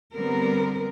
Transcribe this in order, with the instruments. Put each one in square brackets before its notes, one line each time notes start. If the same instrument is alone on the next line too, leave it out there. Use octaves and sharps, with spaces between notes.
[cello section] D3 G3 B3 C4 A#4